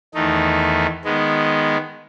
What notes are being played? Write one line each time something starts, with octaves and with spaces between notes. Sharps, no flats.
E2 D#3 A3 D#4
D#3 G#3 B3